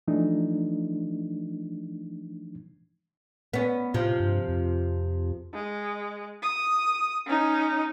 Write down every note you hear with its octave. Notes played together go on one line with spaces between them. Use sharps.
E3 F3 A3 D4 D#4
B3 C#4
A2 C3 F3
G2
F2
G#3
D#6
C#4 D#4